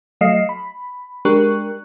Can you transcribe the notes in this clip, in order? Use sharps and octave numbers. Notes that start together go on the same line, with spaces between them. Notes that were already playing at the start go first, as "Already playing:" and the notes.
F#3 A3 D#5 F5 C7
B5
G#3 D4 G4 A#4 C#6 F#6